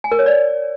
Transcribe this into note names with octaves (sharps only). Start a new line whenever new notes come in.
G#5
A#4
C#5
D5